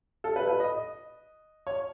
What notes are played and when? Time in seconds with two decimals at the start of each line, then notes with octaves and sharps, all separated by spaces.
0.24 A4
0.36 B4
0.48 B4
0.60 D#5
0.72 D#5
1.67 C#5